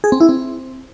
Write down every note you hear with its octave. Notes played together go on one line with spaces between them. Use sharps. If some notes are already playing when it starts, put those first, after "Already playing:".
G#4
C4
E4
C4